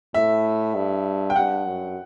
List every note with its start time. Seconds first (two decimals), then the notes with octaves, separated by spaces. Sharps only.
0.14 A2 E5
0.75 G2
1.30 G5
1.36 G2 F#5
1.66 F#2